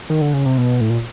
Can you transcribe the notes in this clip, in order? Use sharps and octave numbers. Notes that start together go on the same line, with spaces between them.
D#3
D3
C#3
C3
B2
A2
A#2